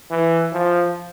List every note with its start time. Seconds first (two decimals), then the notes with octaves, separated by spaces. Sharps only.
0.11 E3
0.52 F3